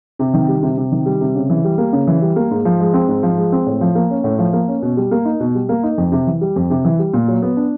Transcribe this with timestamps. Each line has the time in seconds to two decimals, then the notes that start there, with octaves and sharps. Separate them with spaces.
0.19 C3
0.34 D#3
0.48 G3
0.63 C3
0.77 C3
0.92 D#3
1.06 G3
1.21 C3
1.35 C#3
1.50 E3
1.64 G3
1.78 A#3
1.93 C#3
2.07 E3
2.22 G3
2.36 A#3
2.51 G#2
2.65 F3
2.80 G#3
2.94 C4
3.08 G#2
3.23 F3
3.37 G#3
3.52 C4
3.66 A2
3.81 F3
3.95 A#3
4.10 C#4
4.24 A2
4.39 F3
4.53 A#3
4.68 C#4
4.82 B2
4.97 G3
5.11 A#3
5.25 D#4
5.40 B2
5.55 G3
5.69 A#3
5.83 D#4
5.98 F2
6.12 C3
6.27 E3
6.41 G3
6.56 F2
6.70 C3
6.85 E3
6.99 G3
7.13 A#2
7.28 F#3
7.42 B3
7.57 D4